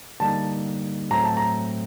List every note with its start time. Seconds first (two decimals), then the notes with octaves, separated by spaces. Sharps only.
0.20 D3 G3 A#3 D#4 A5
1.11 A2 F#3 A3 C4 A#5
1.24 A5
1.37 A#5